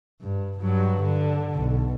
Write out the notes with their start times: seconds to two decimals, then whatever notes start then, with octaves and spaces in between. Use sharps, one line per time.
0.22 G2
0.61 G2 F#3
1.03 D3
1.55 B1